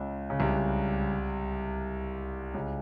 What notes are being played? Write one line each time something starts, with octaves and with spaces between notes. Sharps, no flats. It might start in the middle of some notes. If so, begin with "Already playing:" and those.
Already playing: C#2 C#3
C#3
C2 C3
C#2 C#3